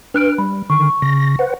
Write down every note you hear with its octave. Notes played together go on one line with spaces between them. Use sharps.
D4 B4 F6 F#6 D7
G3 B5
D3 D#3 C#6
C#3 A#6
B4 C5 F#5